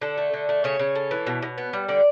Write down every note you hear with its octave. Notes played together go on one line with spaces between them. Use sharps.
D3 A4
A3
D3
A3
C#3 C#5
C#3
A3
E3
B2
B2
B3
G3
D3 D5